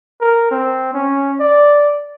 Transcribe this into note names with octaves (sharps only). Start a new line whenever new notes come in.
A#4
C4
C#4
D5